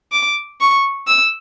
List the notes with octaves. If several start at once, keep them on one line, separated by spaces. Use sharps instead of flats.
D6
C#6
E6